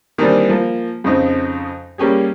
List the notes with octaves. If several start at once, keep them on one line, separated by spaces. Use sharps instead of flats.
D#3 E3 G3 A#3 C4 D4
F3 A#3
F2 C#3 C4 D#4
G3 A#3 C#4 G4 G#4